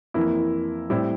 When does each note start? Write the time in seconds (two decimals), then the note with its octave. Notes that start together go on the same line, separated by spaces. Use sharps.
0.14 F2 E3 A#3 E4
0.90 A2 G3 C4 E4